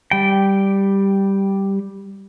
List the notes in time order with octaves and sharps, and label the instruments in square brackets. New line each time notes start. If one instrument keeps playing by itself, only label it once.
[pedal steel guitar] G3 G5